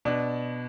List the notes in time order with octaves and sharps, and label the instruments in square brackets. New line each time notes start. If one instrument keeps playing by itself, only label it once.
[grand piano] B2 D4